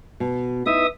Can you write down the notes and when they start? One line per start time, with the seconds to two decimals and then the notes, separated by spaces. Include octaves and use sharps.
0.20 B2
0.66 D#4 E4 B4 E5 D#6